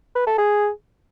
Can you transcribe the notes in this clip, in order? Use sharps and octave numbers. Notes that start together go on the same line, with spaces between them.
B4
A4
G#4